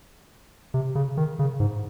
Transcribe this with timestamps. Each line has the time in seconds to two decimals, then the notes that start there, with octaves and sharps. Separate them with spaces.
0.74 C3
0.95 C#3
1.17 D#3
1.39 C#3
1.60 G#2